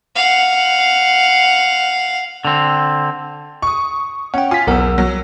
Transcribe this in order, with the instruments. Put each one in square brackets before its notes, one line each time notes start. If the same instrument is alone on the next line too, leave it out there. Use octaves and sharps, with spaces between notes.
[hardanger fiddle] F5 F#5
[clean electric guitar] D3 C4
[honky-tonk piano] C#6 D#6
[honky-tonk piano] C#4 [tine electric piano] F#5 G5
[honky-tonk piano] F4 [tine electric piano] G#5 B6
[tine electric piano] B1 A#4 F#5 [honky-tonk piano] E2 E6
[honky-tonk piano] F#3